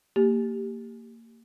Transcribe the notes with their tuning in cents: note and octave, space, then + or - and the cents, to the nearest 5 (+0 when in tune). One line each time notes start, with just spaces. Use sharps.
A#3 -25 G4 +0